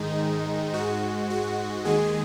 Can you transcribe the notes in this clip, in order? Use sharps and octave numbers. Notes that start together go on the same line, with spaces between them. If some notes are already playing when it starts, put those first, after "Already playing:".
Already playing: G#2 D#3 G#3 D#4
G#2 G#3 F#4
F#4
D#2 D#3 G#3 G#4